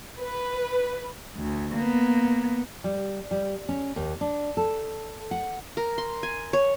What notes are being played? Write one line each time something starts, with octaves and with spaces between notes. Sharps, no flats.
B4
D2
A#3 B3
G3
G3
C#4
D#2
D4
A4
F#5
A#4
C6
G#5
C#5